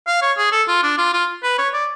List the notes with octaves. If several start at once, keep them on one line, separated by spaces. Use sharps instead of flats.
F5
C#5
G#4
A4
F4
D4
F4
F4
B4
C#5
D5